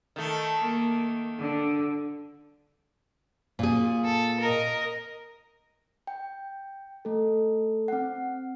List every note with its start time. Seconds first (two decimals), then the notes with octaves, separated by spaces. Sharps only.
0.16 D#3 A3
0.59 A#3
1.38 D3
3.59 A#2 G#4
4.05 A4
4.40 A#4 D#5
6.07 G5
7.05 A3 A4
7.88 C4 F#5